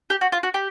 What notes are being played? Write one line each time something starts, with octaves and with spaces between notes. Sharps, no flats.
G4
F#4
F4
F#4
G4